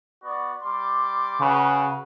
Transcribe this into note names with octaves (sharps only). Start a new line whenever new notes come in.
B3 F#4 D5
G3 C6 D6
C#3 F#4 B4